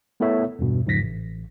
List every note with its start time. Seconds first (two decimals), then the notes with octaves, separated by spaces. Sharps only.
0.20 A3 B3 E4 A4 C#5 E5
0.59 E2 G2 B2
0.86 E2 G#2 C#3 F3 A#6 B6
1.01 A1